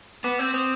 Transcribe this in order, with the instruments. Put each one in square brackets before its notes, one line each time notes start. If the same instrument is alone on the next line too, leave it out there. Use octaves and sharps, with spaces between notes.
[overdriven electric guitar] B3 [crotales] D6
[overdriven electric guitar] C4 [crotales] E6
[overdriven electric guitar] C4 [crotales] D#6